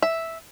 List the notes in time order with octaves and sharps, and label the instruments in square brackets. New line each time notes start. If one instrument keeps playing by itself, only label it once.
[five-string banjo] E5